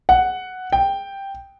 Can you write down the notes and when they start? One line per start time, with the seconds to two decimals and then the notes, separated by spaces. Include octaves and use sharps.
0.09 F#5
0.72 G5